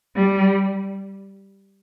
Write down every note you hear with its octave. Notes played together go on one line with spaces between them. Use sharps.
G3